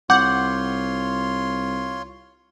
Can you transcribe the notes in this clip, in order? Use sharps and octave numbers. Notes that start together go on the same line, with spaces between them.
C2 F4 C#5 F#5 C6 D6 G6